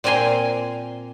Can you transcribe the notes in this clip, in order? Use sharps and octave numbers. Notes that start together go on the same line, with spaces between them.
A#2 C4 G5 G#5 A#5 C6